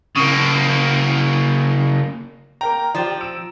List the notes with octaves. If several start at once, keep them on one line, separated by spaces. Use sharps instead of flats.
C#3 A#3
A#3 A#4 G5 A#5
F3 G4 C5 D5
E6 D7 E7